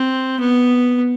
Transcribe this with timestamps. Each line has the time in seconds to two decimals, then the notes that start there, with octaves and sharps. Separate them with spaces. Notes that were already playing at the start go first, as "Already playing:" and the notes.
Already playing: C4
0.40 B3